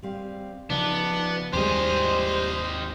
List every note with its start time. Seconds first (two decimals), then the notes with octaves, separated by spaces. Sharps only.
0.02 G3 C4 F5
0.70 C#3 F3 B3 D4 D#4 F4
1.53 D#2 G#2 C3 G3 G#3 G4 C5 D#5